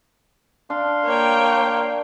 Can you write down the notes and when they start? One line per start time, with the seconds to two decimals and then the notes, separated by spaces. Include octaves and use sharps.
0.70 D4 F5 C6
1.05 A#3 C#5 G5